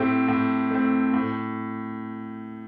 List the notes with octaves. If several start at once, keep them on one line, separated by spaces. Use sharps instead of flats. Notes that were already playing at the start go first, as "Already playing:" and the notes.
Already playing: A2 A3 C4 G4
A2
A3 C4
A2